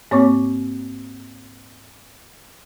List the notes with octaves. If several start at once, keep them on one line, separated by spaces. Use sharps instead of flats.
G#2 A#3 C4 C#5 C#6 D6